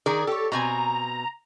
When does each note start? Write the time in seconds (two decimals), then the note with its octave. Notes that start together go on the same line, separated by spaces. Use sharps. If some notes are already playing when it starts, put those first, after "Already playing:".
0.06 D#3 G#4 A#4 D5
0.27 G4 A4 C#5
0.52 B2 C4 G#5 A#5